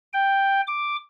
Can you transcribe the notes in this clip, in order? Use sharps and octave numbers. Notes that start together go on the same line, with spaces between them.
G5
D6